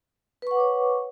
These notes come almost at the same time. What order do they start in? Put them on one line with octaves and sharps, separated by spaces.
B4 C#6 F#5 D6 C#5